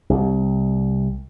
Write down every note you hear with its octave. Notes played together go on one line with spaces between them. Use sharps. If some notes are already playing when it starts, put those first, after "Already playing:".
C2